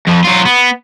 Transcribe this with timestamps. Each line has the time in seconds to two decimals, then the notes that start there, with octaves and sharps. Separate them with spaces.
0.07 F2 F3
0.24 F#3 F4
0.45 B3